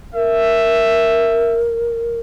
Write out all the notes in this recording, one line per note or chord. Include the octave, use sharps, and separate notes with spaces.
A#4 E5